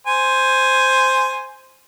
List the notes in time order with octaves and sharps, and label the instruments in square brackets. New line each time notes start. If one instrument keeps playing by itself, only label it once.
[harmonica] C5 G#5